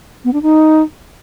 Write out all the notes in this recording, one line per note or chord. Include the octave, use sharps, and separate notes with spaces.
B3
D4
D#4